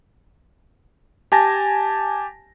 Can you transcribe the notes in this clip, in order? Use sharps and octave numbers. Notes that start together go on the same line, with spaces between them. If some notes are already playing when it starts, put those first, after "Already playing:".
G4 G#5 A5 A#6